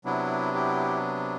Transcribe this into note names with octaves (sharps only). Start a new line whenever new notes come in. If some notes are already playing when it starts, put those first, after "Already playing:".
C3 F#3 B3 D4 E4
E4 G4